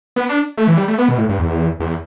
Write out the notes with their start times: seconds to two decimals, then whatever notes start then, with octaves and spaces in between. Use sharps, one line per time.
0.16 B3
0.29 D4
0.57 A3
0.67 E3
0.77 G3
0.88 A3
0.98 B3
1.09 B2
1.18 A2
1.29 G2
1.39 E2
1.80 E2